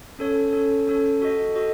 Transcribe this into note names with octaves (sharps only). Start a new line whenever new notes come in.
C#4 A4 C#5
C#4 A4 C#5
C#4 A4 C#5
F#4 A4 D#5
F#4 A4 D#5